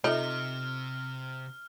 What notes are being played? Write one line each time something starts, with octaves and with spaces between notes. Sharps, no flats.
C3 D#4 F4 A4 E5 F6